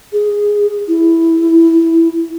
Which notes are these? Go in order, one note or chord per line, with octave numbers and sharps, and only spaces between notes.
G#4
E4